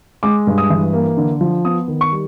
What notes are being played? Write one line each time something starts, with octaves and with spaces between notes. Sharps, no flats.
G#3 D6
G2
D#6
E3
A#3
D3
F3
B3 D#6
D#3
C#6
G3